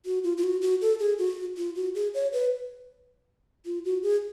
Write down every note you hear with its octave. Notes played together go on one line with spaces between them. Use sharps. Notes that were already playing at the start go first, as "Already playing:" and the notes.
F#4
F4
F4
F#4
F#4
A4
G#4
F#4
F4
F#4
G#4
C#5
B4
F4
F#4
G#4